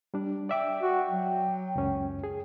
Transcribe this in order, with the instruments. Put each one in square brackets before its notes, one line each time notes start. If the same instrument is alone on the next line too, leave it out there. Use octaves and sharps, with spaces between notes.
[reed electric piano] G3 D4
[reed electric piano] D5 E5 D6 [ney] G5
[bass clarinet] F#4
F#3
[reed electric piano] C#2 F#2 C#4
G#4